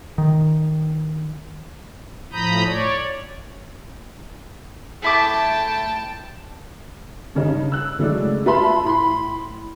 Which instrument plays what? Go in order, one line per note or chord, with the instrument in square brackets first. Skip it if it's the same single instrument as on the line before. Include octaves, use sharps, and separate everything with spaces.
[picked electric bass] D#3
[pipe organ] A2 F3 A#5 B5 D#6 G6
C#5 D5
[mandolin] A3 E4 D6 [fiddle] G5 A5
[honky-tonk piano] G2 C#3 C#4 D#4
E6 F#6
C#3 F#3 G#3 A3 D4
F4 B4 E5 A5 B5 C6
A2 B5 C6